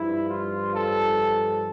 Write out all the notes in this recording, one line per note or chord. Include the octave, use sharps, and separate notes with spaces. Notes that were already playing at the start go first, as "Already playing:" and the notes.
Already playing: G2 F3 E4
F4
A4